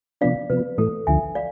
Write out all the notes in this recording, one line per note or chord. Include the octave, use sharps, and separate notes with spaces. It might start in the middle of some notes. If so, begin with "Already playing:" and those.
C3 F3 B3 D4 D5 F5
C3 F3 B3 B4
A2 E3 A3 A4
D2 D3 F3 E5 G#5
D5 F5